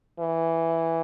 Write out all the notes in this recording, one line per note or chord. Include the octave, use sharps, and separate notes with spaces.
E3